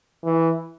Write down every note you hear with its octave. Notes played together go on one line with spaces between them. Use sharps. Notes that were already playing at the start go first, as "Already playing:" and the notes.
E3